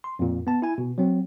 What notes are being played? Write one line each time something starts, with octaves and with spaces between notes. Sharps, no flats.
C6
F2 A#2
B3 A5
E4 G#5
B2
F#3 C4